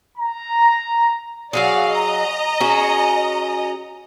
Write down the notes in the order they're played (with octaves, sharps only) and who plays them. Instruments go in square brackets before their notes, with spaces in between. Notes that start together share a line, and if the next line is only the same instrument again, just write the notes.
[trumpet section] A#5
[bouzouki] F#3 F#4 G#4 [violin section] D5 F5 F#5
[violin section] D#5 A#5
[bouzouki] C#4 F#4 G#4